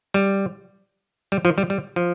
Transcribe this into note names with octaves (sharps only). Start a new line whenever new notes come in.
G3
G3
F3
G3
G3
F3